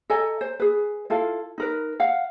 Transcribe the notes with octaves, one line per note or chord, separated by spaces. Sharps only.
A4 D#5 G#5 A#5
C5
G#4 B4
E4 F4 A4 F5
D#4 A#4 B4
F5 F#5